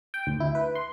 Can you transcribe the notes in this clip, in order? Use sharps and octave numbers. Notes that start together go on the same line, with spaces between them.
G5
D2
E4
B4
C6